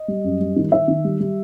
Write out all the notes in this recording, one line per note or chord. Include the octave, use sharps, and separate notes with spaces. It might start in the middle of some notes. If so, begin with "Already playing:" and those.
Already playing: D#5
G3
F#2
G3
D#3
D#3 E5
D#3
G3
G3